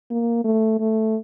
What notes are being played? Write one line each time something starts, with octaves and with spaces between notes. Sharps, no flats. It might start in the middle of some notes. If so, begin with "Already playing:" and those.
A#3
A3
A3